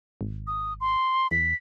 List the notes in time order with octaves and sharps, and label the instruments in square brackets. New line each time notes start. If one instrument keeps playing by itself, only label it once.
[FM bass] G#1
[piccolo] D#6
C6
[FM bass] E2 [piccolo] B6